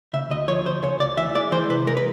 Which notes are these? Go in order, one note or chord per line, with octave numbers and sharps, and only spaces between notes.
C#3 E5
D2 D#5
F3 C#5
D2 C5
C#3 C#5
C#2 D5
E3 E5
G#3 D5
E3 C5
C3 B4
G#3 A#4
B4